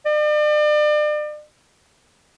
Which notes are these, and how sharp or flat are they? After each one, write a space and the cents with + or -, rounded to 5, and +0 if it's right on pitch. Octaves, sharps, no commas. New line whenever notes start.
D5 +40